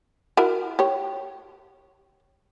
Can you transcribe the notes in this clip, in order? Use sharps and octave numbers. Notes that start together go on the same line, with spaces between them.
E4 F#4 A#4
G4 C#5